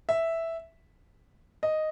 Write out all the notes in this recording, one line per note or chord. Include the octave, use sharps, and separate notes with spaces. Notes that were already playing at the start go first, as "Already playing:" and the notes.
E5
D#5